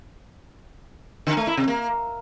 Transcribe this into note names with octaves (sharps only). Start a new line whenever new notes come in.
D3
A3
E4
C3
A#3